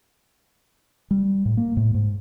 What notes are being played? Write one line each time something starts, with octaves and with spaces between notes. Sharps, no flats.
G3
A2
A#3
A2
G#2